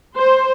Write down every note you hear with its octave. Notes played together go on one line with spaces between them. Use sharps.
C5